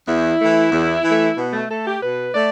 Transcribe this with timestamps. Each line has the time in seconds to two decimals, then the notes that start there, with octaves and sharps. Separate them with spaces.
0.07 E2 E4
0.39 E3 A3
0.72 E2
1.04 E3 A3
1.37 B2 B3
1.53 A3
1.69 A3 A4
1.86 G4
2.03 B2 B4
2.34 A3 D5